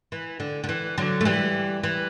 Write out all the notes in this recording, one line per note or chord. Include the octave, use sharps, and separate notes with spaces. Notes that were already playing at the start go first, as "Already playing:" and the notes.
E3
D3
D3
E3
D3 F#3
A3
E3 G3
E3